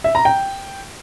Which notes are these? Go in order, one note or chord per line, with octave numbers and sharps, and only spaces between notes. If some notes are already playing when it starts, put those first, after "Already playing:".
E5
A#5
G5